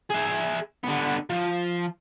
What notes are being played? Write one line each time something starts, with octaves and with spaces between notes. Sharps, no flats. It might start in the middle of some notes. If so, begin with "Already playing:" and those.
G#4 E5
D3 B3
F3